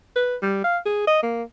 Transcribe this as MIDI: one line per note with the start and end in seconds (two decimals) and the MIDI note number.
0.16 0.35 71
0.42 0.62 55
0.64 0.78 77
0.85 1.06 68
1.07 1.22 75
1.23 1.43 58